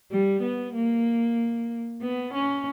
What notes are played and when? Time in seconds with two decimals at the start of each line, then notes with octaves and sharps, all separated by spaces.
0.11 G3
0.42 B3
0.74 A#3
2.02 B3
2.34 C#4